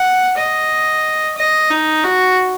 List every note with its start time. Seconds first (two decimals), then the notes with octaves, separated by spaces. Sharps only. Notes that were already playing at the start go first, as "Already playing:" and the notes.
Already playing: F#5
0.37 D#5
1.38 D#5
1.71 D#4
2.04 F#4